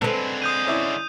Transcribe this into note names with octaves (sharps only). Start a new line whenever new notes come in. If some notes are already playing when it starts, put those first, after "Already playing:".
D3 G#3 C4 A4 B4
D#6 G6 D#7
C#4 E4 D5